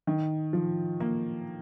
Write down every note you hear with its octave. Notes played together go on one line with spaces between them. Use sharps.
D#3
F3
A#3